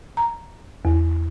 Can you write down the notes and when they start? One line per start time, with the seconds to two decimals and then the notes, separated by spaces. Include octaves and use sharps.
0.17 A#5
0.85 E2